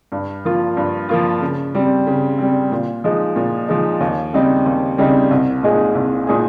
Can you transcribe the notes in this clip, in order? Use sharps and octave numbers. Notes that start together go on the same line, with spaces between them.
G2
F3 A#3 F4
G2
F3 A#3 F4
C#3
G3 C4
C#3
G3 C4
A#2
F3 G#3 D#4
A#2
F3 G#3 D#4
D#2
C#3 G3 C4 D#4
D#2
C#3 G3 C4 D#4
C2
A#2 G#3 D#4 G#4
C2
A#2 G#3 D#4 G#4